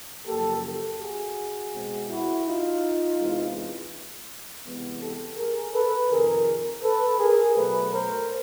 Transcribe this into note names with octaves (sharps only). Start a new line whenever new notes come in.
F#2 C#3 F3 A#3 G4 A4
G4 A4
F#4 G#4
B2 G#3 C4
E4 F#4
D#4 F4
E2 C3 E3 G#3
C3 E3 G#3 B3
G4 A4
G#4 A#4
A4 B4
F2 C3 D#3 G#4 A#4
A4 B4
G#4 A#4
B2 F#3 A3 A4 B4
A#4 C5